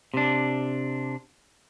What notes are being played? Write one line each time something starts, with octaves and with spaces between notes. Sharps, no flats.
C3 D4